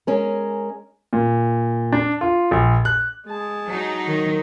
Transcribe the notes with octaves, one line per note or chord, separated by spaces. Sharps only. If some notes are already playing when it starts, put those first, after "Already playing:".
G#3 C#4 A#4
A#2
D4
F4
A#1
F#6
G#3 A5
F#3 D#4
D#3 A#4